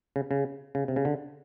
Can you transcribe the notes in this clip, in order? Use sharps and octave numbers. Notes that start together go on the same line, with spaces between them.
C#3
C#3
C#3
C3
C#3
D3